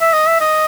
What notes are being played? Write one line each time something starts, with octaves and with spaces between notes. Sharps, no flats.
E5
D#5
E5
D#5